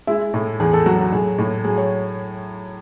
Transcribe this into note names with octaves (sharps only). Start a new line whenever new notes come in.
G#3 E4
A2
E2 G#4
A4
F#3 F#4
F#4
A2 G#4
A2
F#3 G#4
C#5